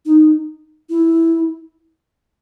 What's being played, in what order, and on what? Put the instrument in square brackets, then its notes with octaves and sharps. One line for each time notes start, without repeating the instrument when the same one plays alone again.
[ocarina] D#4
E4